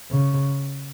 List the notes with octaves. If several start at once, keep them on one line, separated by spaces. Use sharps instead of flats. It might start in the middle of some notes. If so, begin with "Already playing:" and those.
C#3